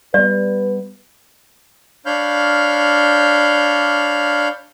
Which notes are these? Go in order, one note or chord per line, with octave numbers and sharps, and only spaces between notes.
G3 B3 B4 D5
D4 C#5 F5 B5 F6 G6